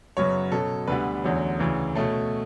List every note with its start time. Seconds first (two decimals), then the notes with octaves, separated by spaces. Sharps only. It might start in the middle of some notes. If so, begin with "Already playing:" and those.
0.17 F#2 C#3 F#3 B3 C#5
0.52 B2 F#3 C#4 A4
0.88 D2 D3 G3 B3 B4
1.24 E2 D3 F#3 A3 C#4
1.60 D2 C#3 E3
1.95 B2 A3 C#4 A4